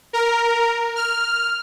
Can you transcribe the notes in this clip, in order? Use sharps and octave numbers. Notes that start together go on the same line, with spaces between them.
A#4
F6